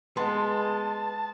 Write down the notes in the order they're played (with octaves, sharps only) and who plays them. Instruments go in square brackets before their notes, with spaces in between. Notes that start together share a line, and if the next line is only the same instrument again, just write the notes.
[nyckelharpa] G#3 [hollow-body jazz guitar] B3 [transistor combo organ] A5 [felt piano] C6